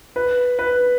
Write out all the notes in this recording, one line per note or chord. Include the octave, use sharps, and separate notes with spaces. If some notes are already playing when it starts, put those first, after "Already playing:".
B4
B4